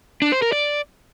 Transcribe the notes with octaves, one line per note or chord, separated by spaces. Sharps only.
D4
C5
A#4
D5